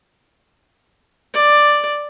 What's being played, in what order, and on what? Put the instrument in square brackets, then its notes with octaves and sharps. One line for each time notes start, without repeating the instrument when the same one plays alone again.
[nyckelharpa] D5